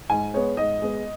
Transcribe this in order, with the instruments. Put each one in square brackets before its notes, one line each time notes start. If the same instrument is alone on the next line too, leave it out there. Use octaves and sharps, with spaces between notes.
[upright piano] G#2 G#5
G#3 B3 C#5
G#2 D#5
G#3 B3